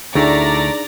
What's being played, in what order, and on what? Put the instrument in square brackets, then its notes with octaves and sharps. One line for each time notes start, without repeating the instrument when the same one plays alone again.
[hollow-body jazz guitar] D2 [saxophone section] A2 A3 [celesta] D4 D#4 G#4 [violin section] D5 A#5